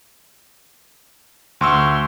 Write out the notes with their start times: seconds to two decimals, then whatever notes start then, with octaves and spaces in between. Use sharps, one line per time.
1.61 D2 C6 C#6 E6